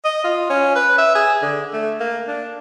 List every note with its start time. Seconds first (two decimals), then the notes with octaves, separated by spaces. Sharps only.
0.05 D#5
0.24 F4
0.50 C#4
0.75 B4
0.98 E5
1.15 G#4
1.42 D3
1.73 A3
2.00 A#3
2.27 D4